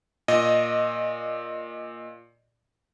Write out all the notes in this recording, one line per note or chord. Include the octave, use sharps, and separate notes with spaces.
A#2 D#5